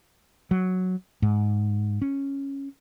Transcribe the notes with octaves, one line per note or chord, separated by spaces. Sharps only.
F#3
G#2
C#4